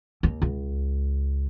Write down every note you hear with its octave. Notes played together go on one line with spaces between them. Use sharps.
D#2
C#2